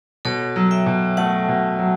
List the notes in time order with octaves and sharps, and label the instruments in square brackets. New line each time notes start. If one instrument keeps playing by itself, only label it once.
[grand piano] B2 [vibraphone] A4 C#5
[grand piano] F#3
[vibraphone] E5 G5
[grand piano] B2
[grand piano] A3 [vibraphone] F#5 A5
[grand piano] B2
F#3